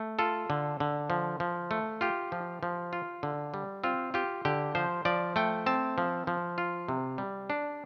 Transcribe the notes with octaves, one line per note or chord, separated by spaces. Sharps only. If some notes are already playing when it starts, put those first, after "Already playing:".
Already playing: A3
F4 A4
D3
D3
F3
F3
A3
F4 G4
F3
F3
F4
D3
G3
C4 F4
F4 G4
D3 G4
F3 C5
F3 D5
A3 G5
C4 A5
F3
F3
F4
C3
G3
D4